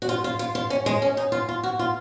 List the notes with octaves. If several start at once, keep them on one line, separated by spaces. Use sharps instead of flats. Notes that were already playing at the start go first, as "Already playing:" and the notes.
F#4
F4
F4
F4
F4
C#4
G#3
C#4
D#4
F4
F4
F#4
F4